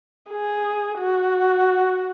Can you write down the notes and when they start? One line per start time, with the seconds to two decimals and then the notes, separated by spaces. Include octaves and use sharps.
0.31 G#4
0.98 F#4